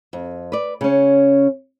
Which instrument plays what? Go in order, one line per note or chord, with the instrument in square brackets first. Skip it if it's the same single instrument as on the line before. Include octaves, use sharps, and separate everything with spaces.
[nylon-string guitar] F2
B4 D5
C#3 C#4